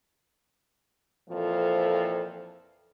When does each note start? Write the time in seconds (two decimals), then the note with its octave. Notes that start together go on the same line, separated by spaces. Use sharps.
1.29 F2 A#2 E3 F3 A4 C5